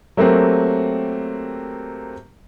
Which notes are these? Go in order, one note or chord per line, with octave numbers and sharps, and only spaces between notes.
F#3 A3 A#3 C4 G4